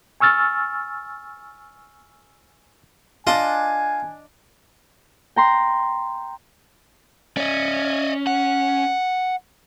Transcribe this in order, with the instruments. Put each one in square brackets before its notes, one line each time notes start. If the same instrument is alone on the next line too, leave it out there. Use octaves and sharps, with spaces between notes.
[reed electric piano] G#5 C#6 E6 F6 A6
[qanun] D4 D#5 [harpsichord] F4 A5 [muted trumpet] G#5
[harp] G5 A#5 C6
[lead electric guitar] C#4 [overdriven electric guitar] D5 D#5
[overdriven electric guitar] F#5